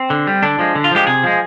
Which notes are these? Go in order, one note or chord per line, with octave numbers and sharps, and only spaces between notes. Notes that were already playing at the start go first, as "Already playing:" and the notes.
Already playing: C4
D3
G3
D3 D4
F3 G#3
D3
F4
F3 G#3 G4
C3 G#4
F3 G#3